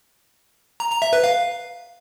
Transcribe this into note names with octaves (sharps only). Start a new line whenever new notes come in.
A#5
A#5
E5
B4
F5